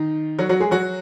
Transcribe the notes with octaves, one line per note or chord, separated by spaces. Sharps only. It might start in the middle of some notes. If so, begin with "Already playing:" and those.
Already playing: D#3 D#4
F#3 F#4
F#3 F#4
G#3 G#4
F#3 F#4